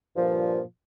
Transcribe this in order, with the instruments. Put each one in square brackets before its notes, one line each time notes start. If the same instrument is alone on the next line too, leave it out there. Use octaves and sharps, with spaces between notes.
[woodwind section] G2 A#2 F3